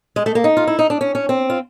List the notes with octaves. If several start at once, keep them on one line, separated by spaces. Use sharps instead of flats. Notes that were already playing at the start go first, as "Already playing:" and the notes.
G#3
A3
A#3
D#4
F4
E4
D#4
D4
C#4
C#4
C4
F4